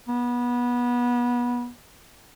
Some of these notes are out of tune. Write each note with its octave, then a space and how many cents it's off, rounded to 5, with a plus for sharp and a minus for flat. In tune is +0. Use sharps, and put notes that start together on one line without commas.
B3 -25